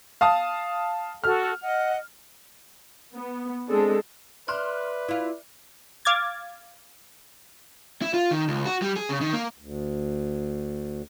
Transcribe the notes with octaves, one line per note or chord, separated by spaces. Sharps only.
F5 A5 D#6
F#4 A4 F6
D#5 F#5
B3
G#3 C4 D4 A4
B4 D5 E5 C6 D6 F6 F#6
E4 F4
F5 D6 G#6 A6
E4
F4
D#3
C#2
F#4
G3
G#4
C#3
D#3
A#3
D2